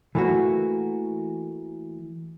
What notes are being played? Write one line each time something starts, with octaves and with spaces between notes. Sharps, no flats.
E3 A3 A#3 F#4